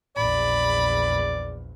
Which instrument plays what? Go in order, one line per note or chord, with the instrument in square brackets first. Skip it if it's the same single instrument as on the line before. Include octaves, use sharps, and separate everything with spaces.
[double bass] A#1 E2 [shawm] D5 [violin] B5